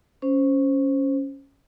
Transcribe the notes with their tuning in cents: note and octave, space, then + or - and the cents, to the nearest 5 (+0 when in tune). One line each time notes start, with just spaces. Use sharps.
C#4 +0 C5 +0